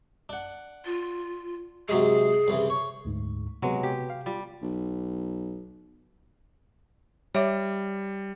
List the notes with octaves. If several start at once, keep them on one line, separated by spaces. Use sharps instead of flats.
D4 F#5
F4
C3 F#3 G#3 G#4
C2 C#3 E3
C#5
D2 G#2
C3 F#3 G#3 B3 B4
G4
F5
G3 F4
B1
G3 C#5 E5 D6